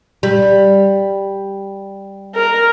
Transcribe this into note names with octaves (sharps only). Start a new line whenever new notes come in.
G3
A#4